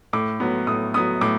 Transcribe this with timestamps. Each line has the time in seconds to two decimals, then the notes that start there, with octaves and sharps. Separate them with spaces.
0.13 A2 D6
0.40 F#3 B3
0.67 A2 D#6
0.94 F#3 B3 D#6
1.21 A2 D6